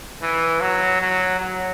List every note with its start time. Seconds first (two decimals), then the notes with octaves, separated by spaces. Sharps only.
0.22 E3
0.61 F#3
1.01 F#3
1.40 F#3